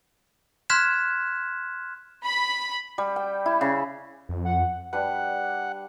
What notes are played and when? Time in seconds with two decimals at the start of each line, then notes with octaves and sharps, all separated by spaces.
0.70 C6 F6 F#6 G#6 B6 E7
2.24 B5
2.98 G3
3.16 G5
3.46 E4
3.61 C#3
4.29 F2
4.45 F#5
4.93 G3 D4 B4 F#5